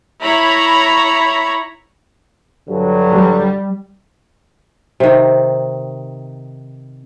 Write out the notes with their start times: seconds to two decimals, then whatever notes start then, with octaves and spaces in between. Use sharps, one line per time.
0.21 E4 C#5 A#5 B5
2.68 G2 D3 F#3
3.11 G3
5.00 C3 D#3